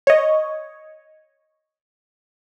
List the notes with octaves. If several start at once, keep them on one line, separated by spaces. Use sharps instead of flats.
C#5 D#5